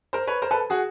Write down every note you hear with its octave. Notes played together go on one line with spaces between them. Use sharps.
A#4 C5
B4 C#5
A#4 C5
A4 B4
F#4 G#4